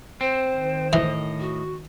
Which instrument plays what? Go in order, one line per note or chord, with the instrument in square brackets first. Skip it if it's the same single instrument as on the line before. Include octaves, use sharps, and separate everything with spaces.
[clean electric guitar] C4 [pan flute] C5
[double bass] D#3
[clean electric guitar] A2 D#5 [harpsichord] E3
[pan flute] F#4